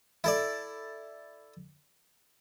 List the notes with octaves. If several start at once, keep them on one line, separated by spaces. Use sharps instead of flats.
E4 A4 D5